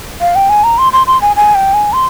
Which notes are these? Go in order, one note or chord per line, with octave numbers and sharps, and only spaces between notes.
F5
G5
G#5
A#5
C6
C6
C6
G#5
G#5
G5
G#5
C6